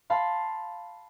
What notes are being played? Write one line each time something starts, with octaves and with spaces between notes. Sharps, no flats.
F5 A5 B5 C6